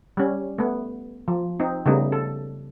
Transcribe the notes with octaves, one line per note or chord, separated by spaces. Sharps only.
G3 C#4
A3 B3
F3
C4 D#4
C#3 G3 A3 B3 D#4
A4